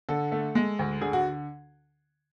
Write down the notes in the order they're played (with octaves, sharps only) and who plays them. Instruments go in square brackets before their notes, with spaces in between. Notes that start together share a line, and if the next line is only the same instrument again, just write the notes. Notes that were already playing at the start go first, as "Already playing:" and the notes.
[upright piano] D3 A4
A3
G#3
D2
D3 G#4
F#4